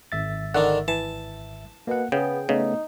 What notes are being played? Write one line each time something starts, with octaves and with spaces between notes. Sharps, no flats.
G#1 E5 A6
D3 D#3 D4 F#5
E3 A5
B2 A#3 F#5
C#3 B3 G#4 G5
C#3 A3 B3 D#4